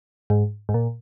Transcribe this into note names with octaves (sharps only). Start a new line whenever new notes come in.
G#2
G#2
A#2